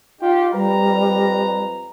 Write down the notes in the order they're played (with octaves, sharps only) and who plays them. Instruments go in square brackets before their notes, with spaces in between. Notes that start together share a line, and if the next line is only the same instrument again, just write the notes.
[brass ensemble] D#4 F4 G4
[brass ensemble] F2 B4 A#5 [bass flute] G3